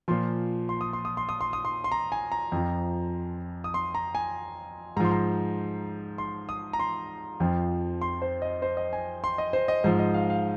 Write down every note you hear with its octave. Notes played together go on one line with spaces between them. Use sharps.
A#2 F3 C6
C6
D#6
C6
D#6
C6
D#6
C6
D#6
C6
C6
A#5
G#5
A#5
F2 F3
D#6
C6
A#5
G#5
G#2 F3 A#5 C6
A#5
C6
D#6
A#5
C6
F2 F3
C6
C5
D#5
C5
D#5
G#5
C6
D#5
C5
D#5
G#2 F3 C5
D#5
F5
F5